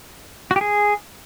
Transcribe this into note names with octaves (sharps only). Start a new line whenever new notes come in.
F#4
G4
G#4